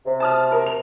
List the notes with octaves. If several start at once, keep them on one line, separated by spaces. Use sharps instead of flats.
C3
A5 D#6 F6
A#4
F7